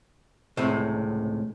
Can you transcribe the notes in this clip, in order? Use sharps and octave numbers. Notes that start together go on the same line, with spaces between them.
C#2 A2 C3